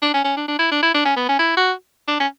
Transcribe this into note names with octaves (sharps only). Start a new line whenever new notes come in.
D4
C#4
C#4
D4
D4
E4
D4
E4
D4
C#4
B3
C#4
E4
F#4
D4
C#4